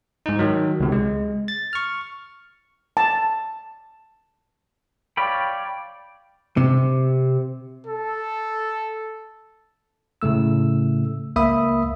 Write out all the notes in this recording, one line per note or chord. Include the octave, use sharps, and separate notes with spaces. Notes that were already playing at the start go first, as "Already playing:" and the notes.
G#2 D#4
D#3 F#3
C#2 C3
G#3
A6
C#6 F6
A5
C#5 D5 F5 G5 B5
C3
A4
A2 C#3 A3 E6
C#2 A#3 E5 B5 D#6